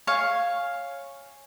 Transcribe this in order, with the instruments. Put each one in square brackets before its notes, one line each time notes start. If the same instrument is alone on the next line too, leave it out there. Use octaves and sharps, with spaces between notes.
[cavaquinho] C#5 F5 G#5